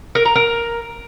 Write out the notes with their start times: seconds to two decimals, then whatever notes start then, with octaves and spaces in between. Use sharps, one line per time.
0.15 A#4
0.25 A#5
0.36 A#4